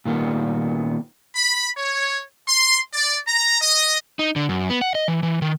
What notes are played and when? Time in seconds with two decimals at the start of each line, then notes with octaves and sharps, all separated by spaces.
0.05 A#2 D#3 G3 B3
1.36 B5
1.77 C#5
2.48 C6
2.93 D5
3.27 A#5
3.60 D#5
4.19 D#4
4.36 D3
4.49 F#2
4.70 B3
4.81 F#5
4.95 D#5
5.08 E3
5.23 E3
5.42 D#3